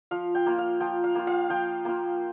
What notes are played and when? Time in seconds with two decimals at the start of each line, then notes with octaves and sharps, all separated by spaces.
0.11 F3 F5
0.35 G5
0.46 A#3 F4
0.58 F5
0.80 F3 G5
1.04 F5
1.15 A#3 F4
1.27 F5
1.50 F3 G5
1.85 A#3 F4